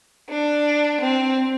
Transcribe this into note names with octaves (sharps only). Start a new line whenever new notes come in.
D4
C4